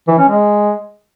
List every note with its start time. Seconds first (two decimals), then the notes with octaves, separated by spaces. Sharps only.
0.08 E3
0.18 C#4
0.29 G#3